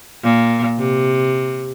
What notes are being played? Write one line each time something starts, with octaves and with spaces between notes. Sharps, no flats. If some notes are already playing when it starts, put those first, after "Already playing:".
A#2
C3